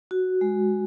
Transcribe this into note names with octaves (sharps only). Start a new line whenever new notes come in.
F#4
G#3